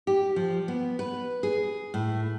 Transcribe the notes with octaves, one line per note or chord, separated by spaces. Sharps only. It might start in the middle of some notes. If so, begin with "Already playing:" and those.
G4
F3
B3
B4
G#4
A2